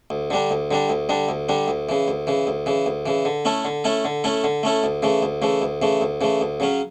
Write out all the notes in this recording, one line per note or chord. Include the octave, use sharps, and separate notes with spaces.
D2
D3 G3 D4
D2
D3 G3 D4
D2
D3 G3 D4
D2
D3 G3 D4
D2
C#3 E3
D2
C#3 E3
D2
C#3 E3
D2
C#3 E3
D3
A3 C#4 E4 A4
D3
A3 C#4 E4 A4
D3
A3 C#4 E4 A4
D3
A3 C#4 E4 A4
D2
C#3 E3 A3
D2
C#3 E3 A3
D2
C#3 E3 A3
D2
C#3 E3 A3
D2
C#3 F#3 C#4